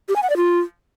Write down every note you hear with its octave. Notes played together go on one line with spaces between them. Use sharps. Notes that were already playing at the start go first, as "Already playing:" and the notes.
G4
G#5
F#5
D5
F4